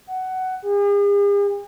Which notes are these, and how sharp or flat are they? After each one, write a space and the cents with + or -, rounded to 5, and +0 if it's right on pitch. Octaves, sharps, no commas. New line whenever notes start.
F#5 +15
G#4 -45